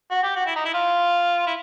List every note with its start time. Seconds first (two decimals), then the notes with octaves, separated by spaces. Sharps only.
0.11 F#4
0.23 G4
0.36 F#4
0.47 E4
0.56 D#4
0.65 E4
0.74 F4
1.47 E4